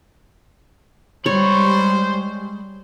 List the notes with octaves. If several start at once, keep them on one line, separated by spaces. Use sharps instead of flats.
G3 G#3 C5 C#5 B5